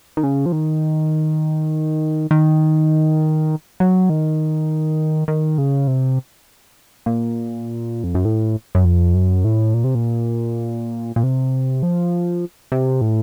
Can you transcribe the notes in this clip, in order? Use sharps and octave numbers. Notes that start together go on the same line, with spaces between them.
D#3
C#3
F3
D#3
D#3
F#3
D#3
D#3
C#3
C3
A#2
F2
F#2
A2
F#2
F2
F#2
A2
A#2
C3
A#2
A#2
C3
F3
C3
A2